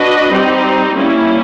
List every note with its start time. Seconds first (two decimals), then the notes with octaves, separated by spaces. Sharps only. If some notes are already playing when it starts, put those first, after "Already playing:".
Already playing: D4 F#4 B4 D#5
0.30 G3 C4 D#4 G4
0.96 G3 A#3 C#4 E4